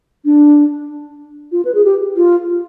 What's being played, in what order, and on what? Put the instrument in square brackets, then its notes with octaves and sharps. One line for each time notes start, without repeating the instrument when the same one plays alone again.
[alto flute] D4
F4
B4
G#4
G4
F4